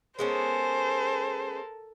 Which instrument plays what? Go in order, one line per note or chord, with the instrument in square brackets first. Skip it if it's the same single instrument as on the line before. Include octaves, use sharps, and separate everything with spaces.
[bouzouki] G#3 B3 C#4 [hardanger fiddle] A4 A#4 [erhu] C5